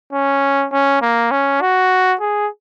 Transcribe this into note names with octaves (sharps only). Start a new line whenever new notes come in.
C#4
C#4
A#3
C#4
F#4
G#4